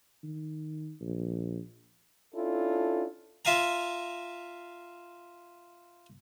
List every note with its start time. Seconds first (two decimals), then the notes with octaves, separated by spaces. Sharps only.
0.23 D#3
1.01 A#1
2.35 C#4 D4 E4 F4 A4
3.45 F4 E5 F5 G#5 A#5